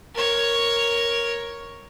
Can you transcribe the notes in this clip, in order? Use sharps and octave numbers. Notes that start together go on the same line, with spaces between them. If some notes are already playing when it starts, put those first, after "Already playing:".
A#4 C#5